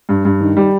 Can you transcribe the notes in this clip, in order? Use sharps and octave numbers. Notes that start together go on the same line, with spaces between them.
G2
G2
D#3
G3